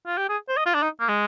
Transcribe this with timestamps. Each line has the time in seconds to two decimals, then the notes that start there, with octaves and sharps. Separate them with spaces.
0.06 F4
0.17 G4
0.29 G#4
0.48 C5
0.57 D#5
0.66 F4
0.74 D4
0.82 D#4
1.00 A#3
1.08 G#3